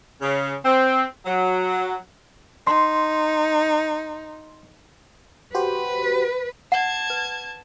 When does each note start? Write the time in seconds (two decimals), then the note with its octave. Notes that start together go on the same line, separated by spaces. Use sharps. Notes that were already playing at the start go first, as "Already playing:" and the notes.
0.21 C#3
0.64 C4
1.26 F#3
2.67 D#4 C6
5.55 F#4 G4 B4 C5
6.72 F#5 A5 G#6
7.10 B4